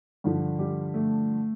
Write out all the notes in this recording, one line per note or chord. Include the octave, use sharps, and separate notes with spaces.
G2 D3 F3
G3 G4
A3 A4